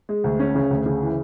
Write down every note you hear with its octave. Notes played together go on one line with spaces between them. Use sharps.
G#3
D2
C#4
C#3
D2
C#3
E3